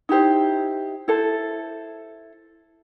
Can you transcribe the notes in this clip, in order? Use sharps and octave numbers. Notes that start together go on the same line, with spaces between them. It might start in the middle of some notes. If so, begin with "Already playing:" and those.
D#4 E4 G4 C5
E4 A4 C5